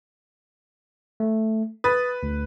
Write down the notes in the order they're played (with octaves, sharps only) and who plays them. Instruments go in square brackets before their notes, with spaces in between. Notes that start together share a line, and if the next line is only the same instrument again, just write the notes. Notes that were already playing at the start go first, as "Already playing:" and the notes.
[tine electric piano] A3
[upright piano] B4 [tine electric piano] D#6 A6
[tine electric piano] D2